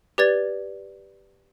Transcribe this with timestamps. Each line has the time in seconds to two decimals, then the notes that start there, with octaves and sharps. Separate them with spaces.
0.18 G4 B4 D5 G#6 A6